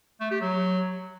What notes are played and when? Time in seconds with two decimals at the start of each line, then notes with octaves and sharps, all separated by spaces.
0.21 A3
0.31 G4
0.41 F#3